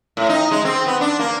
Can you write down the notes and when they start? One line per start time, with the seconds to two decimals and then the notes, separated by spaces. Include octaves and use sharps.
0.17 A2
0.29 D#4
0.51 G#3
0.65 C4
0.87 B3
1.01 D4
1.19 A#3